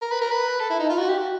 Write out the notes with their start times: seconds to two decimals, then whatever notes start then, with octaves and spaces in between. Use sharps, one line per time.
0.02 A#4
0.11 B4
0.21 A#4
0.31 B4
0.60 A4
0.70 E4
0.79 D#4
0.90 F4
0.98 F#4
1.09 G4
1.18 F#4